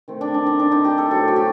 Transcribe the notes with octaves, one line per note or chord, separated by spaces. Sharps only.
D#3 A3 C4
D4
D4
D#4
D4
D#4
G4
A4
A2 F#3 C4 A4
F#4
G4